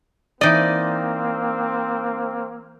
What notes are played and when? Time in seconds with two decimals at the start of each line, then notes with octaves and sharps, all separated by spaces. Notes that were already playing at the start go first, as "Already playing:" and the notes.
0.41 E3 A#3 C4 D#4 D5 D#5